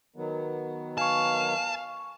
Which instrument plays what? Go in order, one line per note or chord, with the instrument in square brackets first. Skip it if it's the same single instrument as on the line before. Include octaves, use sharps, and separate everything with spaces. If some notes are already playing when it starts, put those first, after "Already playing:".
[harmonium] D#3 F#3 B3
[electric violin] F5 [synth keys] G#5 C#6 [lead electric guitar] A5